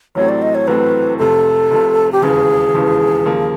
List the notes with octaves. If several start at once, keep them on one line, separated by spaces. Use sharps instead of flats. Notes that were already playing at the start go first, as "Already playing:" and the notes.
A1 A2 F#3 A3 C4 C#5
D5
D#5
C#5
A1 A2 F#3 A3 C4 B4
F1 F2 C3 A4
F1 F2 C3
G4
E1 D#2 C#3 E3 G#4
E1 D#2 C#3 E3
D#2 C#3 F3 A#3